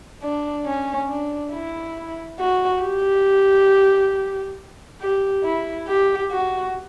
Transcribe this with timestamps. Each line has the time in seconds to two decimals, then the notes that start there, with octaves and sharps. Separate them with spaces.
0.22 D4
0.65 C#4
1.09 D4
1.53 E4
2.39 F#4
2.83 G4
5.01 G4
5.43 E4
5.88 G4
6.31 F#4